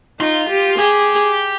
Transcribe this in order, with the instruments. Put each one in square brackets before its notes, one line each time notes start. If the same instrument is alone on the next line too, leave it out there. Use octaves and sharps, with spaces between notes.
[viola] D#4 [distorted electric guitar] F4
[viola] G4
[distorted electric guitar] G4 [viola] G#4